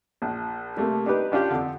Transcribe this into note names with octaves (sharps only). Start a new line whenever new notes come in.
A#1
C3 G3 A3 A#3
D4 D#4 G4 B4
C#4 D4 F4 G4
F2 D3